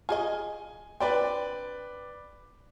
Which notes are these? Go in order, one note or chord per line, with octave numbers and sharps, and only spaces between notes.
F4 G#4 D#5 G#5
C4 D4 B4 D5 G5